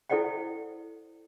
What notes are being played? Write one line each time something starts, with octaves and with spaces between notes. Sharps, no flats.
E4 A4 C5 D5 F#5 G5